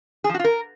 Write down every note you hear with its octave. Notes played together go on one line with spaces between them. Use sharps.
G#4
F3
F#4
F4
A#4